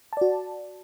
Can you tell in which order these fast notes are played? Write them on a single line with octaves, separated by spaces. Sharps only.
A5 D5 F#4